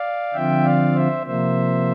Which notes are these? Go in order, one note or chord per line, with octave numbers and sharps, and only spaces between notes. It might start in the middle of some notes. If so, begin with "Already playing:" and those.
Already playing: D5 F5
D3 F3 C4 F4 E5 G5
D5 F5
C5 E5
C3 F3 A#3 C5 E5